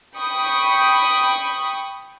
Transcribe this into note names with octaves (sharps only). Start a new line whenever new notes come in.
G5 B5 C#6 D#6